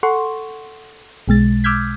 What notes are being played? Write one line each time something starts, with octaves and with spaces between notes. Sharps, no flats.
A4 F#5 C6 C#6
B1 B2 G#3 A6
D6 E6 F6 G6 G#6 B6